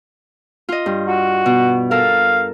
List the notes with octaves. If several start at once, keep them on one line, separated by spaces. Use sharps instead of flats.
F4 D#5
G2
F#4
B2
A4 A#4 F5